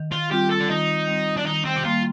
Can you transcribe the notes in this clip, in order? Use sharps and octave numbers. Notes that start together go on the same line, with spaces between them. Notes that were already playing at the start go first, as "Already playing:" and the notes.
Already playing: D#3
F4
G3 C4 F4 G4
A4
D4
D#3 D#4
G3 C4 F4
D4
D#3 D#4
C4
G4
G3 A#3 F4